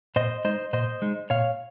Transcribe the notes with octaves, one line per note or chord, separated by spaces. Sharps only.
A#2 C5 D#5
G#3 D#4 C5 D#5
A#2 C5 D#5
G#3 D#4
A#2 C#5 F5